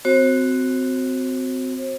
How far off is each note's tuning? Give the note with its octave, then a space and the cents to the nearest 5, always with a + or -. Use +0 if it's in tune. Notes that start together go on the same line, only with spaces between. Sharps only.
C4 -25 F#4 +0 C5 +35